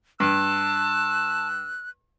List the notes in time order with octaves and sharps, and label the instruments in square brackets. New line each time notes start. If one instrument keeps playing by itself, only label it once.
[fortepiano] G2 [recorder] A5 [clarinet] E6 [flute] F#6